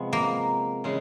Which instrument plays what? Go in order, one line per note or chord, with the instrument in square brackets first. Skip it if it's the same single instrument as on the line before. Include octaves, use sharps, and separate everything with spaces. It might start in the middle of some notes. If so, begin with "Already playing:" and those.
Already playing: [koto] C3 F3 G#3 B3
[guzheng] A#3
[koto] C#3 E3 G#3